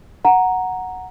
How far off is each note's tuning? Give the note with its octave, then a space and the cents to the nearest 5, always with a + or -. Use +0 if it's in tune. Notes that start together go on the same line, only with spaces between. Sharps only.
F#5 +0 A#5 +0